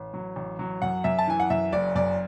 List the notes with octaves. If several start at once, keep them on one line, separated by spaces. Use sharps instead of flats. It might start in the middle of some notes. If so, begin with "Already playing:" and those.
Already playing: A1
F#3
A1
F#3
F#2 F#5
F#2 E5
A5
E3 G#5
F#5
F#2 E5
F#1 D5
F#2 D5